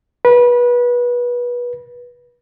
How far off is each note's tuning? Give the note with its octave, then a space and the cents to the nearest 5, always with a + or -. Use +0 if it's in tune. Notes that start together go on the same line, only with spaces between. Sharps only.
B4 -25